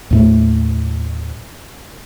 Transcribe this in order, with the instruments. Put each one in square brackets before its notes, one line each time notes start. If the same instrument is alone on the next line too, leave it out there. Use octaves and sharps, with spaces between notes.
[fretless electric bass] D#2 A2 A3